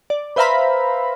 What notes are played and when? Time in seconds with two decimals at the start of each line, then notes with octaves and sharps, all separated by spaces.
0.10 D5
0.36 B4 C5 E5 F5 A#5 B5